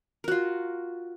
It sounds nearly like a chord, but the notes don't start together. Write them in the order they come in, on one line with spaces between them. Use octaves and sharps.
A#4 F#4 F4